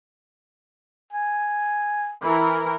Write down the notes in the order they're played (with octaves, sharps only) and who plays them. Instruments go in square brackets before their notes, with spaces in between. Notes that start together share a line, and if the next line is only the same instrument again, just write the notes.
[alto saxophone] G#5
[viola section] E3 A#4